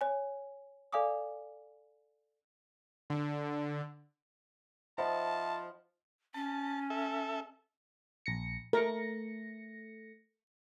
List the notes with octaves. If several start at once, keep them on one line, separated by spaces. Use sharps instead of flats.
C#5 G#5
A4 D5 F5 G#5 D6 D#6
D3
F3 C5 D#5 E5 F#5 A5 B5
C#4 A5
A4 E5
A#1 A#6 C#7
A3 A#4 A#6 C#7